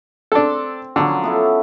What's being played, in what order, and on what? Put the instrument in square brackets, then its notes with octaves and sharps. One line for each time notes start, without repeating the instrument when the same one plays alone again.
[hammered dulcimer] C4 [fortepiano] D4 A4
[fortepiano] D3 [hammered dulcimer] F3 F#3 C#4
[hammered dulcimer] B3 E4 A4